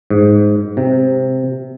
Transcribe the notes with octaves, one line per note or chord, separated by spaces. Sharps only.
G#2
C3